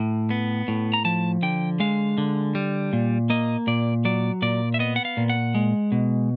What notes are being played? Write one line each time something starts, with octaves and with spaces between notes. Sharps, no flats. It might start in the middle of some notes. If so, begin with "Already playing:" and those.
Already playing: A2
B3
A2
A#5
F3 A5
D3 G5
G#3 F5
D3
G3
A#2
A#3 D#5
A#2 D5
F#3 D5
A#2 D5
E5
B3 D#5
F#5
F5
A#2
F#5
G#3
B2